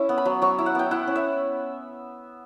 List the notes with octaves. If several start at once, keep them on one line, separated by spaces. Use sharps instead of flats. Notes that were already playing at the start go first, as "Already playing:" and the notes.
Already playing: C#4 E4 E5
B3
B5
F#3
F#3 C#6
E4
F#5
B3 G5
E4 F#5
C#4
E5